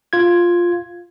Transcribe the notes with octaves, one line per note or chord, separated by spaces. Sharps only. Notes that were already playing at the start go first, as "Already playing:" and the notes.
F4 G#6